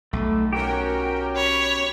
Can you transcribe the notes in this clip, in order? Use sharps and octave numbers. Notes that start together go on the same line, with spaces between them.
B1 A3
C#4 F#4 G4 A#4 G5
C#5 B5